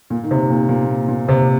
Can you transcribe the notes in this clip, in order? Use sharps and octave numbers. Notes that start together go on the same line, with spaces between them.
A#2
D#3
C3
A#2
A#2
A#2
C3